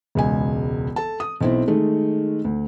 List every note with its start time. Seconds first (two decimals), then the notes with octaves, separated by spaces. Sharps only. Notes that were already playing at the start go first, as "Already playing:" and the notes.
0.15 E1 C#2 G#5
0.96 A4 A5
1.20 D#6
1.41 B1 C4 E4
1.68 D#3 G#3 A3
2.44 D2